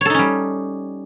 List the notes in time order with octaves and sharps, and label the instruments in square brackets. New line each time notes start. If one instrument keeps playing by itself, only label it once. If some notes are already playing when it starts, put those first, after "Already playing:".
[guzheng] C#5
A4
D#4
C#4
G3